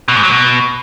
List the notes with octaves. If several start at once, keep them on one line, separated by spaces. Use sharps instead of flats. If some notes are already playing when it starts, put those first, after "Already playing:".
B2
G#2
F#3
B2